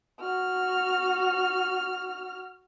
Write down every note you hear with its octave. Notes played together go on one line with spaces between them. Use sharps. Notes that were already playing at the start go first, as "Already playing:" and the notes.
F#4 F6